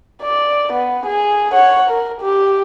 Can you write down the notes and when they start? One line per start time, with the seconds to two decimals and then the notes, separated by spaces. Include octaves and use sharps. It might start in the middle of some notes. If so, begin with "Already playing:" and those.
0.22 D5
0.73 B3
1.06 G#4
1.52 C#5 F#5
1.90 A#4
2.21 G4